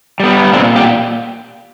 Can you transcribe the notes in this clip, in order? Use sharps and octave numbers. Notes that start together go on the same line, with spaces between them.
G3 B3
A#2 C4 D4
F4 G4